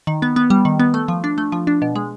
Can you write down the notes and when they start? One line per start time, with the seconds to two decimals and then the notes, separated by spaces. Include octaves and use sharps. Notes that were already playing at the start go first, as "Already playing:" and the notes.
0.07 D#3
0.22 B3
0.36 B3
0.50 G3
0.65 D#3
0.80 B3
0.94 A3
1.08 F3
1.24 D4
1.38 A3
1.52 F3
1.67 D4
1.82 B2
1.96 G#3